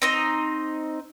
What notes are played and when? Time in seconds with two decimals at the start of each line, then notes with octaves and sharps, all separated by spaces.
0.02 C4 D#4 D#5